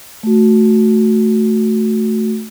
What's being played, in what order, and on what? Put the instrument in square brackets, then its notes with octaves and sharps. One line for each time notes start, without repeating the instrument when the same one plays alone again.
[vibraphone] A3 F#4